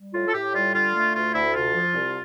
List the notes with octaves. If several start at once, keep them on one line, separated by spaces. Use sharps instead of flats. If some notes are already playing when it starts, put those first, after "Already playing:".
Already playing: G3
A2 F4
A4
A2 G4
G3 F4
D3 F4
A3
D2 F4
D2 E4
C3 F4
F3
C2